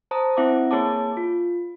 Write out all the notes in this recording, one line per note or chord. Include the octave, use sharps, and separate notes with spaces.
C5 A5 A#5 D#6
C4 E4 E5 F#5 D6
A#3 G#4 C#5 A5 D6
F4